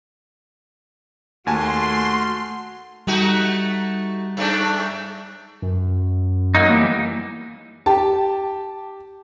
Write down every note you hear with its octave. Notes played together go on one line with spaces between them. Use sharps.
D#2 A3 F#4 G#5 A5 C6 F6
G3 A3 D#4 F#4
G2 A3 D4
F#2
F#3 A#3 D#4
E3 G3 A#3
G4 A5